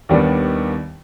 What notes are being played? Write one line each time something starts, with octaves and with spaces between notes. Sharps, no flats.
D#2 D#3 G3 B3 D4